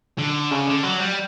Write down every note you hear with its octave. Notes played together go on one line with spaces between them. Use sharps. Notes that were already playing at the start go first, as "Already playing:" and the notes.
D3
C#3
D3
F#3
G3